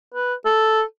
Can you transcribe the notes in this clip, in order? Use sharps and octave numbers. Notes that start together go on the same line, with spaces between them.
B4
A4